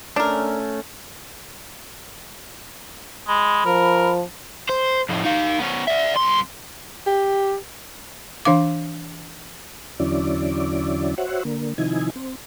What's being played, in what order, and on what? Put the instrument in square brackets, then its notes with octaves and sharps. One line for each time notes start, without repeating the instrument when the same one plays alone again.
[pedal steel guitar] A3 C#4 [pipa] D4 A#4
[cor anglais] G#3 [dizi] B5
[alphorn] F3 [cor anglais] A#4
[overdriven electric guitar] C5
F2 A2
D#4 F5
B3 C#4
D5 E5
C2 C6
[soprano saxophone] G4
[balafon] E3 D4 F5 D6
[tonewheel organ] E2 D3 F#3 C#4 E4 D5
F#4 C5 C#5 E5 F#5
D3 A#3
C3 D#3 F3 D#4 E4 G#5
C4